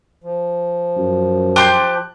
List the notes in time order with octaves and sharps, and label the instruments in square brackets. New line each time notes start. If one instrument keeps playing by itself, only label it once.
[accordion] F3
[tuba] F#2
[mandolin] G4 C6 G6 [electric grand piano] A5 D6 F#6